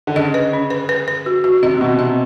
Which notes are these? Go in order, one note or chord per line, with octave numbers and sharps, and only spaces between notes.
D3
C#3 D#5
B4
C#4
B4
B4
B4
F#4
F#4
C3 D#5
C3
B2 F#4
C3 D#5